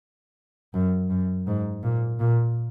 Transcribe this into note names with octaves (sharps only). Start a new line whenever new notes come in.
F#2
F#2
G#2
A#2
A#2